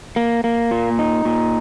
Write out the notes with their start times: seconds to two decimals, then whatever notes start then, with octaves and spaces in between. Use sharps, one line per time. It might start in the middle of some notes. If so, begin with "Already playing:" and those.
0.16 A#3
0.44 A#3
0.71 A#2
0.99 D#4
1.25 A#2